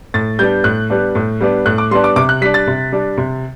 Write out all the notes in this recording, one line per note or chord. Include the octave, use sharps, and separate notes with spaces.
A2 A6
G3 B3 D4 G6
A2 F#6
G3 B3 D4
A2
G3 B3 D4
A2 F#6
D6
G3 B3 D4 C6
D6
C3 D6
F#6
G3 D4 B6
A6
C3
G3 D4
C3